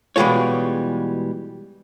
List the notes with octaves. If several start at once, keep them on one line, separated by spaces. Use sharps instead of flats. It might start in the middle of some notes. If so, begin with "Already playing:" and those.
B2 E3 G3 G#3 F4 C#5